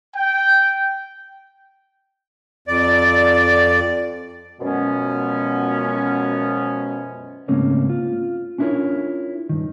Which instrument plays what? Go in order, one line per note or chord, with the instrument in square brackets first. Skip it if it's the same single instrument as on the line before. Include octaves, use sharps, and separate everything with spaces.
[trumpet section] G5
[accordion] F2 D5
[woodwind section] F#2 B2 F3 G#3 B3 C#4
[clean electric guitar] G#2 C#3 A3 A#3 C4 C#4
F4
C#4 D4 E4 F4 A#4 C#5
G2 D#3